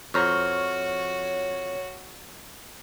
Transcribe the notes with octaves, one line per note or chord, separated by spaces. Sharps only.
F2 F#4 C5 C#5 A#5 C#6 F6